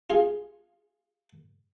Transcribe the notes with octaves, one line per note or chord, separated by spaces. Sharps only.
F4 G#4 F5